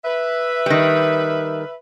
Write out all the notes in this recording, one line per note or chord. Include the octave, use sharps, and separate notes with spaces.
B4 E5
D#3 G3